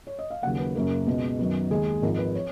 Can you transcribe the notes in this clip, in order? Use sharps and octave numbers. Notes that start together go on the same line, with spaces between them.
C#5
D#5
F5
D#2 C#3 F#3 A#3 F#5
B4
F#2 C#3 F#3 A#3 A#4
C#2 B2 G#3 B3
F#2 D#3 F#3 B3
D#2 D#3 G#3 G#4
G#1 G#2 F3 A#4
B4
C#5